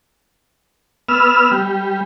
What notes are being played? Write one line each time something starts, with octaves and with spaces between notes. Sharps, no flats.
B3 E6 F6
G3